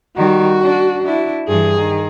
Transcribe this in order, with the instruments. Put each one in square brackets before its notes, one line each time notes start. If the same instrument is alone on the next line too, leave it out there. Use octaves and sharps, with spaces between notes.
[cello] D#3 G3 [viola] F#4
[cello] D4
D4 E4
[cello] G2 E3 [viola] G#4
[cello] D#3